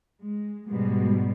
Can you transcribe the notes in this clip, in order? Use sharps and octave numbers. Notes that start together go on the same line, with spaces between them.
G#3
G#2 B2 G3 G#3